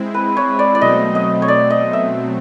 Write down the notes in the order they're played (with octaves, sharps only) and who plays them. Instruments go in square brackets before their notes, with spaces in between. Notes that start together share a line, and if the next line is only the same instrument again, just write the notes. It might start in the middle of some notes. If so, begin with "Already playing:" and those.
Already playing: [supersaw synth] G#3 C4 E4
[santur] B4
C#5
D5
D5
[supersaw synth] B2 F#3 A3 C4 [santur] D#5
[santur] D#5
C#5
D5
D#5
E5